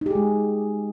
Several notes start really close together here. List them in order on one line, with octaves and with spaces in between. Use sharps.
D#4 G4 G#4 G#3